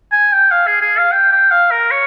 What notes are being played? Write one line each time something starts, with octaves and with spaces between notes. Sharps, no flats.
G#5
G5
F5
G#4
G#4
F5
G5
G5
F5
A#4
C#5